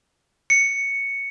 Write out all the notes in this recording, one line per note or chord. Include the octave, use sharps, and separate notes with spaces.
C#7